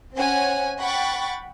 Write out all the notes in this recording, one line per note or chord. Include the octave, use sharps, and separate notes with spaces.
C4 C#4 F#5 G#5
F#5 G5 B5 C#6 A6